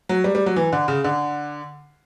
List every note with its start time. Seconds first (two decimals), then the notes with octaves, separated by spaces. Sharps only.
0.09 F#3
0.24 G3
0.35 G3
0.46 F#3
0.56 E3
0.73 D3
0.88 C#3
1.04 D3